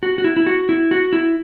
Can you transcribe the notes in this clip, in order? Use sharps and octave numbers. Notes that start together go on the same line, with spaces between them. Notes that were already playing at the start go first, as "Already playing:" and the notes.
F#4
F#4
E4
E4
F#4
E4
F#4
E4